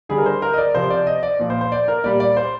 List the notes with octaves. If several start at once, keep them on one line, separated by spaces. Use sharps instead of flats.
D3 G3 G#4
A#4
C5
A#4
D#5
D5
C3 F3 C5
D5
D#5
D5
A#2 F3
C5
C5
D5
A#4
A#2 G3 D5
D5
C5